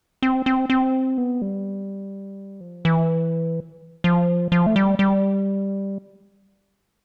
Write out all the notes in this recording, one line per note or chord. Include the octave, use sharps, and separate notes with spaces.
C4
C4
C4
B3
G3
F3
E3
F3
F3
A3
G3
G3